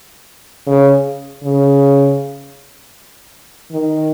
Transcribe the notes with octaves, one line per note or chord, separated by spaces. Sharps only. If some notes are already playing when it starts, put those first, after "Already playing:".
C#3
C#3
D#3